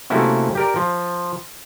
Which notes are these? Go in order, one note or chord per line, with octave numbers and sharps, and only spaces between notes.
C3 A3 A#3 C#4 E4 F#4
G4 A#4 D5
F3